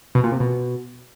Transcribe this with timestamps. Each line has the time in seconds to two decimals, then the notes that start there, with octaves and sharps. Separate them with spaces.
0.15 B2
0.23 A#2
0.32 C3
0.40 B2